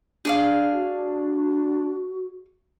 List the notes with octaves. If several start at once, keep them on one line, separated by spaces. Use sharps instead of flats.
D4 G#4 D5 F5
F#4